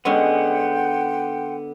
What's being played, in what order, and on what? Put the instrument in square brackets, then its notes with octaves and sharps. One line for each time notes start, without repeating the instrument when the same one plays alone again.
[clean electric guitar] D3 B3 [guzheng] G#3 C#4 [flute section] F#5 G5 C6